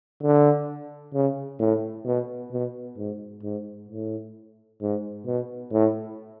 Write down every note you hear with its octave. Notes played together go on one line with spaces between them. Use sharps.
D3
C#3
A2
B2
B2
G#2
G#2
A2
G#2
B2
A2